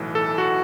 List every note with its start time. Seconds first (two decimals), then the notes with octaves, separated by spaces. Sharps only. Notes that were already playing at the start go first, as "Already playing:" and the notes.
Already playing: B1 A2 E3
0.15 A4
0.38 F#4